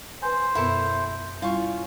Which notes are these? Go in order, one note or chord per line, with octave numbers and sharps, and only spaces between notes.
B4 C5 G#5
F#2 B2 B3 E4 A4 A#4
G3 C#4 E4 F4 C#6